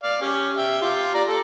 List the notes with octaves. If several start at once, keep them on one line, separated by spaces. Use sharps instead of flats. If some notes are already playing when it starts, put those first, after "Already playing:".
D5 F5
C#4 G4
E5 G5
F4 G4
D5 A#5
A4